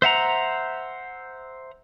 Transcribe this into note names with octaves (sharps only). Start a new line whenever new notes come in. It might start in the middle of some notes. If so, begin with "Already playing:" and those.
C5 E5 F#5 A#5